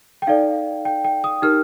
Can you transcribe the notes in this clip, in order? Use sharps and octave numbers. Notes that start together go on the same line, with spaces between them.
G5
D#4 A4 D5 F5
G5
G5
D#6
D#4 G4 A#4 F6